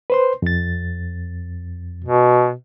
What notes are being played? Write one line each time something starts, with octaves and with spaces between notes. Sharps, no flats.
B4 C5 C6
F2 A6
B2